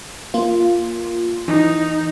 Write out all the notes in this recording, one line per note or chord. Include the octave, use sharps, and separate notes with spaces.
A#3 F4
E3 D#4